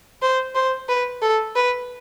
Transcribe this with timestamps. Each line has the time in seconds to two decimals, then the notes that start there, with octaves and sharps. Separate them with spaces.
0.22 C5
0.55 C5
0.89 B4
1.22 A4
1.56 B4